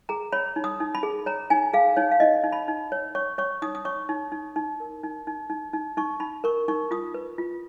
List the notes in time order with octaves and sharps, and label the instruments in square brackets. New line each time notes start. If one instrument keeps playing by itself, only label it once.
[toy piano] G#4 A#5
C#5 B5
D#4
D#6
D#4
B5
G#4
C#5 A#5
D#4 G#5
G#4 F5
D#4 C#5
F5
D#4 D#5
D#4
B5
D#4
C#5
C#5 C#6
C#5 C#6
D#4 D#6
D#6
C#5 C#6
D#4
D#4
D#4
A#4
D#4
D#4
D#4
D#4
D#4 C#6
D#4 B5
A#4 C#6
D#4 C#6
F4 D#6
B4
F4